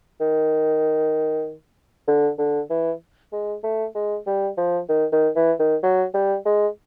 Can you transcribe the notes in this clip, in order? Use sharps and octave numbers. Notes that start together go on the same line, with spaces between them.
D#3
D3
D3
E3
G#3
A3
G#3
G3
F3
D#3
D#3
E3
D#3
F#3
G3
G#3